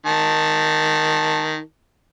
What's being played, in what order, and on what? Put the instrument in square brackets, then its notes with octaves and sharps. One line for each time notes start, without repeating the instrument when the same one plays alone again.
[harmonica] D#3 A5